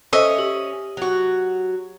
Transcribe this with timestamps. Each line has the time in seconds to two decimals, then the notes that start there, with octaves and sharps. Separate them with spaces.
0.13 C#4 A4 C5 D#5 E5
0.38 G4 F#7
0.97 F#3 F#4